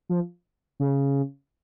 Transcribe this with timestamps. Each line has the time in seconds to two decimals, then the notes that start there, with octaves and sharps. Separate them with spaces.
0.09 F3
0.80 C#3